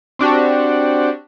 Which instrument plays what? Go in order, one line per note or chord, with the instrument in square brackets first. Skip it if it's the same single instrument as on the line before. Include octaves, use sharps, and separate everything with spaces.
[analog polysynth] C4 D4 F#4 G4